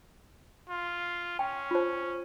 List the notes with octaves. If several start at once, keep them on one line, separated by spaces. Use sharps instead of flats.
F4
C#4 G5
F4 C5